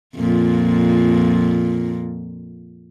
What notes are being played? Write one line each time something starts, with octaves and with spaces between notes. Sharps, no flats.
F2 A#2